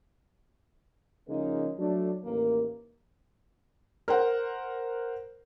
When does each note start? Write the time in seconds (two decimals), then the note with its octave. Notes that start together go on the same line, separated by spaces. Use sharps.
1.29 C#3 F3 G#3 A#3 C#4 D#4
1.78 F#3 A3 D4
2.24 A1 D#2 A#3
4.08 A#4 C5 F#5